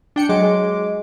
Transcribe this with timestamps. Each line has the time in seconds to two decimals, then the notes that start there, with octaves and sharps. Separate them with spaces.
0.16 D4 G5 C#7
0.29 F#3 G#3 D6
0.43 G#3